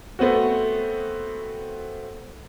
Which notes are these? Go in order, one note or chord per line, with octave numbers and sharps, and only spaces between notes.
A3 B3 C4 F#4